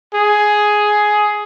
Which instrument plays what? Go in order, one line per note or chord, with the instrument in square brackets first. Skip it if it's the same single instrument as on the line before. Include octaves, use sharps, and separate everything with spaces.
[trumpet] G#4